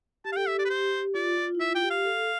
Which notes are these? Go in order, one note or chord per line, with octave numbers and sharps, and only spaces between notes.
G4 A5
F5
A4 G5
G4 E5
D5
B4
C5
F4 D5
F4
E4
F4 E5
G5
G4
F5
A4